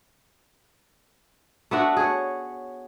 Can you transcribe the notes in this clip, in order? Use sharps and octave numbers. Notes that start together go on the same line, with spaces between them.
A3 B3 D4 F#4
G#4 C#5